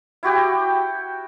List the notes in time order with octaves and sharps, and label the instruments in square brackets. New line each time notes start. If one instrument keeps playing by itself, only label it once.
[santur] E4 F#4 G4 G5